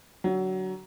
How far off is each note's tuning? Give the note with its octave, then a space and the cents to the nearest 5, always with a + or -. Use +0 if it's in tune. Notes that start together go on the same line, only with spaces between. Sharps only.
D3 +0 F#3 +20